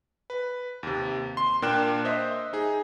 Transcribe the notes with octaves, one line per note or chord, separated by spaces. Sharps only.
B4
D#2 C3
C6
A#2 D4 A#4 G5 F#6 E7
C5 D#5 E5
D#4 G#4